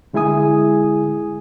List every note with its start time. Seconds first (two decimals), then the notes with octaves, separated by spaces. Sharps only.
0.13 D3 G#3 E4 G#4 G#5 D#6